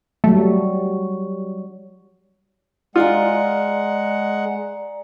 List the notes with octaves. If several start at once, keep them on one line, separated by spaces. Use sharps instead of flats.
F#3 G3 A3
G#3 F4 D5 F#5 G#5 A#5